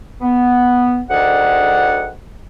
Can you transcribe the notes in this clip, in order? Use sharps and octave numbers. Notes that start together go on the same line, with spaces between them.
B3
D2 D#3 G#4 D5 F#5